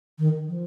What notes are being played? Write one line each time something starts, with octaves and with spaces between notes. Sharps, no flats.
D#3
F3